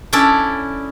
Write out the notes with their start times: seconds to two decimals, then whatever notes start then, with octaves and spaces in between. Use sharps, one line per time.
0.13 C#4 D4 E4 A4 D5